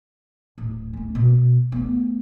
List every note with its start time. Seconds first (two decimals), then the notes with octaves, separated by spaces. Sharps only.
0.58 D1
0.93 A3 C#4
1.15 B2
1.72 A3 B3